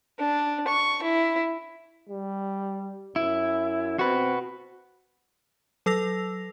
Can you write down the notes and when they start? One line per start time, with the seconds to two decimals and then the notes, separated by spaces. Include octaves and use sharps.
0.18 D4
0.68 C#6
1.02 E4
2.09 G3
3.16 F#2 E4
3.99 C4 F#4 B4
5.86 F#3 A4 E6 A#6 F7